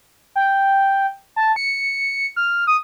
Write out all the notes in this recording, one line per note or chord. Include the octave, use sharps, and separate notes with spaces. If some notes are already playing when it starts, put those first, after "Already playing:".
G5
A5
C#7
F6
D#6